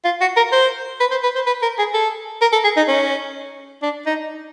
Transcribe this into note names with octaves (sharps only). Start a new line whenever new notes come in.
F4
F#4
A#4
C5
B4
C5
B4
C5
B4
A#4
G#4
A4
A#4
A4
G#4
D#4
C#4
D4
D#4